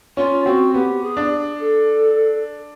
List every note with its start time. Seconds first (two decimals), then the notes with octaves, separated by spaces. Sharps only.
0.17 C#4 F4
0.45 C4 F#4
0.74 B3 G4
1.02 G#4
1.17 D4
1.59 A4